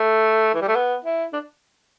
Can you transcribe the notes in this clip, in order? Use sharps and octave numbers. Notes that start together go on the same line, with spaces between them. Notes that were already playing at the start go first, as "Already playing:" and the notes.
Already playing: A3
E3
G3
A3
B3
E4
D4